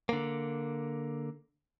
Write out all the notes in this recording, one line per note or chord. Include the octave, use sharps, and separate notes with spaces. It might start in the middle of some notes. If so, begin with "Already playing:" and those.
D3 A#3